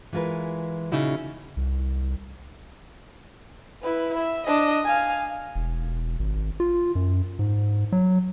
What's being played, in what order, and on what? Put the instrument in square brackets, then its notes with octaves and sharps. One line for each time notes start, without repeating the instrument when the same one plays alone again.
[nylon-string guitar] E3 G#3 F4 A#4 B4
A#2 C#3 D#4 E4 F#4
[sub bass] C2
[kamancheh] E4 B4
E5
D4 D#5
F5 G#5
[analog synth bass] E1
G#1
F4
F#2
G#2
F#3